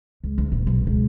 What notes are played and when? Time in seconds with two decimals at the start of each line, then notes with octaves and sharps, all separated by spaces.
0.24 C#2
0.38 D2
0.52 D#1
0.67 B1
0.87 C#2